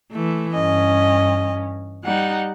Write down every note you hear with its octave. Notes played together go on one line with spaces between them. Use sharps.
E3 A3
G2 C#4 D#5
G3 D#4 F#5